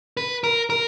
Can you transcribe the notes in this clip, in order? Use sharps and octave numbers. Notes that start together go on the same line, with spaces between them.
B4
A#4
A#4